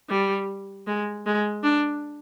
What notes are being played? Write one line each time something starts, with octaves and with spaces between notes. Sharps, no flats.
G3
G#3
G#3
D4